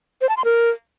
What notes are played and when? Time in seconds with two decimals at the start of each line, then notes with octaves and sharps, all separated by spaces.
0.21 C5
0.29 A5
0.37 C6
0.45 A#4